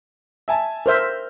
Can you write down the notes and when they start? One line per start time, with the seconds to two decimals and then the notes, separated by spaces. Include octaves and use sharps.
0.48 E5 G#5 A5
0.86 A#4 C5 E5 F6 G6